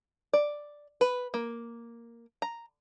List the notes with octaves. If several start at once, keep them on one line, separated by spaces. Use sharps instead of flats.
D5
B4
A#3
A#5